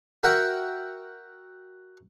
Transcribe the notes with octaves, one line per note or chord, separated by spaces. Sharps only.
F#4 A#4 E5 F#5 G5